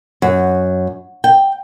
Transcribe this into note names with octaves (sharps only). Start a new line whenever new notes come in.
F#2
G5